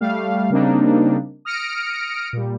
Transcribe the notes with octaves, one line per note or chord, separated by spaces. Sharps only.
G3 A3 F5
C#3 G3 A#3 C4 D4 D#4
D#6 F6 A#6 C#7 D7
A#2 G3